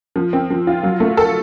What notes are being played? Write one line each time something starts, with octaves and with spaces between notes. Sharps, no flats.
F3
C4
F3
F4
F#3
A3
A4